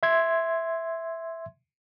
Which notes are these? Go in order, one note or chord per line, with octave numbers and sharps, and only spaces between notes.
E5 C6 G#6